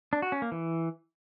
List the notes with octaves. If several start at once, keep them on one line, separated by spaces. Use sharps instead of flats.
D4
F#4
C#4
A#3
E3